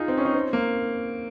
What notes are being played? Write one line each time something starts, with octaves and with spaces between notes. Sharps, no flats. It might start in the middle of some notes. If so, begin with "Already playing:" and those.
Already playing: D#4 F4 G#4
C4
C#4
D#4
C4
A#3